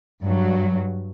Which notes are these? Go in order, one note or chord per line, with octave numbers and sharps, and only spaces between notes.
G2 F#3